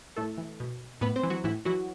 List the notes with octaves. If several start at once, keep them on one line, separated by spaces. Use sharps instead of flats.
A2 A3 A4
E3
B2
A2 B3 B4
C4 C5
E3
F#3 F#4
A2 E3 E4
E3 F#3 F#4